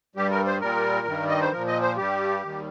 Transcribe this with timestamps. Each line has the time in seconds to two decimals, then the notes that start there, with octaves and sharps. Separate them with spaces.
0.16 G2 G3 G4
0.31 A#4
0.46 C5
0.61 A#2 G3 A#4
1.07 G2 D#3 G3
1.29 D#5
1.41 C5
1.52 A#2 F3 A#4
1.67 D#5
1.82 C5
1.97 G2 G3 G4
2.42 D#2 D#3 G3